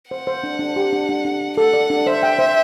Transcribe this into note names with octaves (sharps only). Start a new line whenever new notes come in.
C5 F#5
C5
D4
D4
G4
D4
D4
D4
D4
A4 F#5
D5
D4
C5 E5
G5
C5